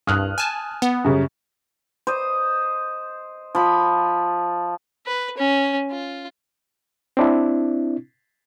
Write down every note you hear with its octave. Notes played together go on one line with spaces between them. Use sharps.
C2 G2 D#6 F6 F#6
G#5 A5
B3
F#2 C#3 G3
C5 D#5
F3 B5
B4
C#4
F4
C4 D4 E4